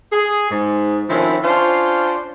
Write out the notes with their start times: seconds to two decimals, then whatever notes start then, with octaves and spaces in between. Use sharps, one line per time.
0.12 G#4
0.50 G#2
1.09 D3 D#3 F3 C4 C#4 E4
1.44 C#4 D4 F4 C5